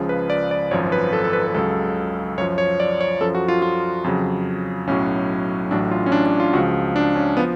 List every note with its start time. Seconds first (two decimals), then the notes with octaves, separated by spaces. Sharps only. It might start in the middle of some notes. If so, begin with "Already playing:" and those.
Already playing: C#2 C#3 F3
0.09 B4
0.30 D5
0.51 D5
0.71 G#1 F#2 F3 C#5
0.92 B4
1.13 A4
1.24 A4
1.33 B4
1.48 B4
1.54 C#2 C#3 F#3 A4
2.38 F#2 C#5
2.41 F3
2.58 C#5
2.80 D5
3.00 C#5
3.21 F#2 F3 A4
3.35 F#4
3.48 F4
3.62 F4
4.04 F2 C#3 F#3
4.87 B1 A2 F#3 C#4
5.71 A1 A2 F#3 D4
5.91 F4
6.06 C#4
6.12 D4
6.26 D4
6.40 F4
6.53 C#2 C#3 F3 F#4
6.96 D4
7.16 C#4
7.37 F3 B3